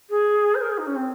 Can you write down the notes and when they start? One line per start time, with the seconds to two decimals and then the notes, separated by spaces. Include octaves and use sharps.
0.10 G#4
0.55 C5
0.61 A#4
0.70 G#4
0.78 D#4
0.87 C#4
0.95 C4